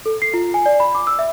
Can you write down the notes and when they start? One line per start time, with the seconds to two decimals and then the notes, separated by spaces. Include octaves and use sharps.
0.06 A4
0.22 C7
0.34 F4
0.54 G#5
0.66 D5
0.80 B5
0.95 D6
1.07 E6
1.19 E5